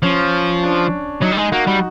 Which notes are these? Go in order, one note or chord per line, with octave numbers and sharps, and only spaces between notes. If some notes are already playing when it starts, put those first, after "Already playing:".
F3 C#4
D4
F#3 D#4
G3
G#3 D#4
A#3 F#4
G3